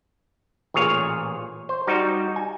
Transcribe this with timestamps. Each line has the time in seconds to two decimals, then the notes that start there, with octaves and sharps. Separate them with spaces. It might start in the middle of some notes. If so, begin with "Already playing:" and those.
0.74 A1 A#2 G#4 C#5 F5
1.69 C5
1.87 G3 D#4 F#4
2.36 G#5